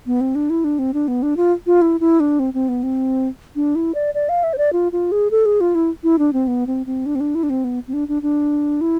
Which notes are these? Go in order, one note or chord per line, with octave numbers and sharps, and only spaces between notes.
B3
C4
D4
E4
D4
C4
D4
B3
D4
F4
F4
E4
E4
D4
C4
C4
B3
C4
D4
E4
D5
D5
F5
E5
C5
D5
F4
F4
G#4
A4
G#4
F4
E4
E4
D4
C4
B3
C4
C4
D4
C4
D4
E4
D4
C4
B3
C4
D4
D4
D4
E4